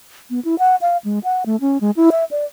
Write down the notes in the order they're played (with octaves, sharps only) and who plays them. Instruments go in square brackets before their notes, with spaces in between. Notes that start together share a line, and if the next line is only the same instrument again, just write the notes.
[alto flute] B3
E4
F#5
F5
G#3
F#5
A3
C#4
G#3
E4
E5
D5